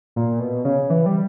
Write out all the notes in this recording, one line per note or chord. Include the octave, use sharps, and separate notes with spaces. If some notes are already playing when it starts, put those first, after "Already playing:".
A#2
B2
C#3
E3
G3